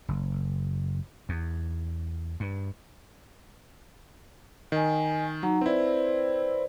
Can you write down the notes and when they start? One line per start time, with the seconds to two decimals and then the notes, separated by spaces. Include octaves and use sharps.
0.09 F#1
1.29 E2
2.40 G2
4.72 D#3 D#5 G#5
5.43 F#3 D#4 F#5 A#5
5.61 C4 E4 B4 C5 D5